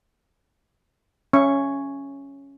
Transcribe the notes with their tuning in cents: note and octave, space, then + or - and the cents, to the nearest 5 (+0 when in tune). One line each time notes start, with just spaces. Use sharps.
C#4 +0 E5 +35 C#6 +0